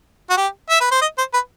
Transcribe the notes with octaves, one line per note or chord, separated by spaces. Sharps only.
F#4
G4
E5
B4
C5
D#5
C5
B4